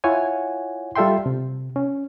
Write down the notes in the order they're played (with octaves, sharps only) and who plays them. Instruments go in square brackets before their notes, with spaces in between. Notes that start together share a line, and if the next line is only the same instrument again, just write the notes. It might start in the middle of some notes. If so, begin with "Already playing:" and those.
[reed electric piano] E4 F4 C#5 F#5 G#5
G3 F4 A4 E5 G5 C6
C3
C#4